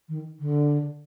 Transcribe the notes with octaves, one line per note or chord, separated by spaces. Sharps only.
D#3
D3